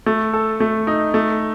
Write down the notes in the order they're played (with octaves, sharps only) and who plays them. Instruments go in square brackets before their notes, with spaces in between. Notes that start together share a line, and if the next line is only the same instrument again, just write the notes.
[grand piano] A3
A4
A3
D#4
A3